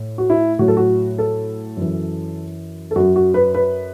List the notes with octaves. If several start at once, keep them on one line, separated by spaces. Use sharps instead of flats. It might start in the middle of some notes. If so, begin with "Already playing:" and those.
Already playing: A2
F#4
E4
A2 F#3 F#4
A4
F#4
A4
F#2 E3
A4
F#2 F#3 F#4
F#4
B4
B4